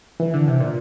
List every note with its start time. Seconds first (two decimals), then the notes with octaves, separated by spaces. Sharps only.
0.20 E3
0.34 D3
0.48 C3
0.60 A#2